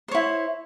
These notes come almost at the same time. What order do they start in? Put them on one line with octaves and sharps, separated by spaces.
C5 C#5 E4